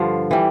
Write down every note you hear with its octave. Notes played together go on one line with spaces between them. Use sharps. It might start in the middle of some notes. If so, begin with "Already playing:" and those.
Already playing: G2 D3 F3
E3 G3